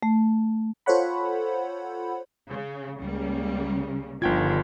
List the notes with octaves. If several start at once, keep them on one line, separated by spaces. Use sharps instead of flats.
A3
F4 A4 C5 C#5 F#5 B5
C#3
C#2 C#3 G3 A#3
G1 G2 D3 D#3 F3 F4 G5 G#6